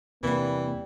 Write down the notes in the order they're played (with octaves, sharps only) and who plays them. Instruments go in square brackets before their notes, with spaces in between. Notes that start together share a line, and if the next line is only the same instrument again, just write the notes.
[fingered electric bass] E2 C3 [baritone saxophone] E3 [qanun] G3 D4 [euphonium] A#3